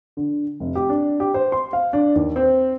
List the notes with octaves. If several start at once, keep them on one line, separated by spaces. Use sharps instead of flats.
D3
F1
G4
D4
G4
C5
C6
F5
D4
D#2
C4